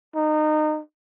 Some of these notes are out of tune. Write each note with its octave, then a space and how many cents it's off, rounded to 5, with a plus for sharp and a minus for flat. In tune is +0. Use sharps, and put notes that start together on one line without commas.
D#4 -25